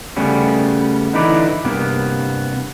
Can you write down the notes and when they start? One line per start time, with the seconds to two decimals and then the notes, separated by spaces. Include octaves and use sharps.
0.16 C#3 G3 A3 B3 C#4
1.13 D3 E3 D#4 E4 B4 D5
1.65 G2 C3 A#3 B3